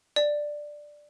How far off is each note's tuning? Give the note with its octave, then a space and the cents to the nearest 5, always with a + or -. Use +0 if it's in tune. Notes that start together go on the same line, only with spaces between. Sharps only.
D5 +5